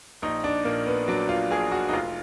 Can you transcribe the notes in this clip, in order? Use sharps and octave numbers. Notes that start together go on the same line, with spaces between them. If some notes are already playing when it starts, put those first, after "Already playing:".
A#1 D#4
D4
A#2 A#3
B3
F#3 D4
F4
A#1 G#4
F#4
D#4
F1 F4